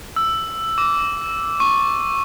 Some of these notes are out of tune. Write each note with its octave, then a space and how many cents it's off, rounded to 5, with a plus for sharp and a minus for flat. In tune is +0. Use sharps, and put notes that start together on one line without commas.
E6 +5
D6 -20
C#6 -15